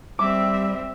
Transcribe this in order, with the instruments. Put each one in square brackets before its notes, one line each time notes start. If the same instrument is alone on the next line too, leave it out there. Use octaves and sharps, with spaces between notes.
[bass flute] G3 [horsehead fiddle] C4 E5 [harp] D6